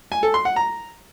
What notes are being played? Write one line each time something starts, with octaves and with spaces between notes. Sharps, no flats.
G#5
A4
C6
F#5
A#5